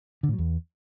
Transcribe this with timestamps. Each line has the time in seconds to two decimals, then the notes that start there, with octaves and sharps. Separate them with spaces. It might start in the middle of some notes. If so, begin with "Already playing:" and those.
0.23 D3
0.28 A2
0.33 F#3
0.38 E2